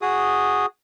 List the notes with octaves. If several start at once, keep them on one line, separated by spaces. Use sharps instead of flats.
F#4 G#4 D#6